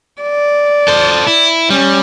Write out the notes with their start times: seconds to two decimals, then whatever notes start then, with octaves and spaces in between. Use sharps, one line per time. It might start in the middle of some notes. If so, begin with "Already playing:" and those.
0.23 D5
0.88 A4 C5
1.27 E4
1.70 G3 C#4